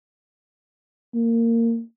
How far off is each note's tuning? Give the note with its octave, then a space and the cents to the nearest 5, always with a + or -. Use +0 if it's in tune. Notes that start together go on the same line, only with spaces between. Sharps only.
A#3 -20